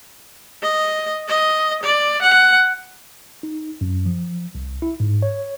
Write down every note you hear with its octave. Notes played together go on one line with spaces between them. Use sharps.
D#5
D#5
D5
F#5
D#4
F#2
F3
C2
E4
G#2
C#5